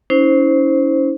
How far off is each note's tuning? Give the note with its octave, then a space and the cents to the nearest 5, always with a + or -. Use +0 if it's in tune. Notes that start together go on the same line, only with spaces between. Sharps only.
C#4 +15 E4 -40 C5 +0